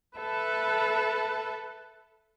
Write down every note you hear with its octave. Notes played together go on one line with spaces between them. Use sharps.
A4 B4 E5 A5